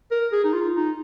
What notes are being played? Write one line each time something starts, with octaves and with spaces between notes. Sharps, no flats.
A#4
G#4
D#4
F4
D#4